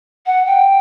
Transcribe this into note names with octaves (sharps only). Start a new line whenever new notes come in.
F#5
G5